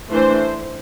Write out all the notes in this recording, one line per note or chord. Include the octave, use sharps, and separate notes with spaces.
E3 A3 D4 C5